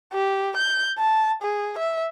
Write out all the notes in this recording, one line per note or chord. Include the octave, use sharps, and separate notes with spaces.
G4
G6
A5
G#4
E5